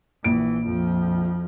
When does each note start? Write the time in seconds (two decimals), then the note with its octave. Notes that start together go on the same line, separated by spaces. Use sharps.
0.24 A#1 E3 D7
0.65 F2 F3